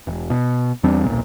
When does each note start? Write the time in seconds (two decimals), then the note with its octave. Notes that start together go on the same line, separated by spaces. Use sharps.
0.07 E1
0.30 B2
0.83 E2 G3 C4 D4
1.05 D#1 B1 A#2